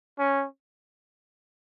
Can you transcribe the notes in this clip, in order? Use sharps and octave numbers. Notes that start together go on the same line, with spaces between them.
C#4